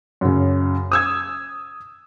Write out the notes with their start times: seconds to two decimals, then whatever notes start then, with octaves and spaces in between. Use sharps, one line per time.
0.21 F#2 C#3
0.92 D#6 E6 G#6